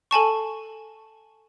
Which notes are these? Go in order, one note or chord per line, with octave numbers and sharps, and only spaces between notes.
A4 G#5 A5 C#6